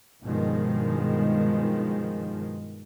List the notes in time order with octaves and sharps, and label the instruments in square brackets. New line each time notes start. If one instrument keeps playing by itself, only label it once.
[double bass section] G2 B2 D#3 F3 G#3